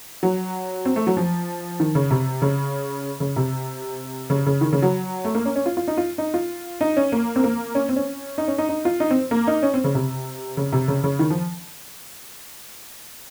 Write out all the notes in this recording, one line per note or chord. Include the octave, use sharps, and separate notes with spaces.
F#3
C4
A3
F#3
F3
D#3
C#3
C3
C#3
C#3
C3
C#3
C#3
D#3
C#3
F#3
A3
A#3
C#4
C#4
F4
F4
D#4
F4
D#4
F4
D#4
C#4
A#3
C4
A#3
C#4
C4
C#4
D#4
C#4
D#4
D#4
F4
D#4
C4
A#3
D#4
C#4
C4
C#3
C3
C#3
C3
C#3
C#3
D#3
F3